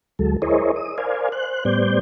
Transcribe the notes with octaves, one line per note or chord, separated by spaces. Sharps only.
D2 F#3 G#3 A4
E4 G#4 A#4 C5 C#5 D#5
D#6
A#4 C5 D5 F5 G#5
C5 F#6
A2 G3 B3 C5 D5 G6